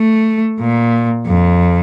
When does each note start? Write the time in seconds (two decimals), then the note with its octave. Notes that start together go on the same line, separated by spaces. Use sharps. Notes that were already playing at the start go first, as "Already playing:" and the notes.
Already playing: A3
0.60 A#2
1.27 F2